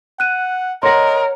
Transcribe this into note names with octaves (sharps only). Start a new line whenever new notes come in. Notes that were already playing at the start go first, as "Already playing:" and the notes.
F#5 F#6 D#7
A#4 C#5 D#5 F#5 C6 A#6